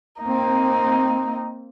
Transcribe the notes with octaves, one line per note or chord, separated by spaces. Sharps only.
A#3 C4 D#4